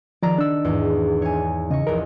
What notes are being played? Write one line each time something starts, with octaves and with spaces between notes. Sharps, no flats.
D#3 F3 D5 A#5
D4 E6
E2 G#2
C#5 G#5
C#3 D#5 C#6
A#1 E2 A#4